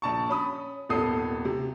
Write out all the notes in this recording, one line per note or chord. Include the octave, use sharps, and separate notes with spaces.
A#1 A5 C#6
C#4 B5 D#6
D#1 G#1 B3 A4 D#6 C7
C3